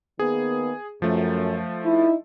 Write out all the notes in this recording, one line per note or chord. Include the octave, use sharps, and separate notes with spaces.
D#3 A#3 B3 G#4
F#2 F3 A3
D#4 E4